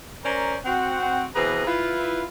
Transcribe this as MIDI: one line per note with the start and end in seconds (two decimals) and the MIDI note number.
0.24 0.55 61
0.24 0.55 70
0.24 0.55 72
0.24 0.55 74
0.24 0.55 82
0.65 1.25 60
0.65 1.25 66
0.65 1.25 78
1.35 1.62 47
1.35 1.62 52
1.35 1.62 60
1.35 1.62 68
1.35 1.62 71
1.35 1.62 82
1.66 2.23 64
1.66 2.23 65
1.66 2.23 71